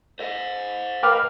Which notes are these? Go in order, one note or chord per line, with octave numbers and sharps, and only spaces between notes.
C5 D#5
A#4 B4 F5 G5 D6 F6